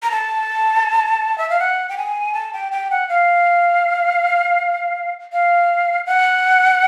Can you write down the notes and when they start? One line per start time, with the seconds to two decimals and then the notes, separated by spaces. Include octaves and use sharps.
0.03 A#5
0.11 A5
1.38 E5
1.50 F5
1.59 F#5
1.89 G5
1.98 G#5
2.34 A5
2.53 G5
2.72 G5
2.91 F#5
3.09 F5
5.32 F5
6.06 F#5